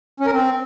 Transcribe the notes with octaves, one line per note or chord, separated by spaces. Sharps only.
C#4
A#4
C4